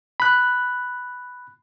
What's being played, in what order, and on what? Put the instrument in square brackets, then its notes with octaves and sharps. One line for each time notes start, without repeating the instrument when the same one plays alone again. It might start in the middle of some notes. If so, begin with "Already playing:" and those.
[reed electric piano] B5 F#6